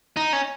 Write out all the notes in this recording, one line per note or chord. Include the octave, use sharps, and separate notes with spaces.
D#4
C#4